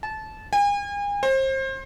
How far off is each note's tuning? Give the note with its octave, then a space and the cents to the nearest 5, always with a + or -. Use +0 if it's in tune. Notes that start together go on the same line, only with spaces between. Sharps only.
A5 -20
G#5 -40
C5 +30